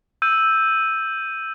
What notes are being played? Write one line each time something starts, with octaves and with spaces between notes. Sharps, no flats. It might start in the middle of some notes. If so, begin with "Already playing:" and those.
E6 G6 D#7